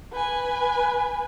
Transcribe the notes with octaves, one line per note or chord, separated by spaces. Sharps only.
B4 G#5